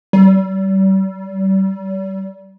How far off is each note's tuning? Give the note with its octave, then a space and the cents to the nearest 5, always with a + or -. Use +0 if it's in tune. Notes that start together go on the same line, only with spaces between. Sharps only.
G3 -35